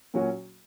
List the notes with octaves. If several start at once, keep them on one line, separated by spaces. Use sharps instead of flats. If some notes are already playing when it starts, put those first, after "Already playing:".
A#2 F#3 C#4 F#4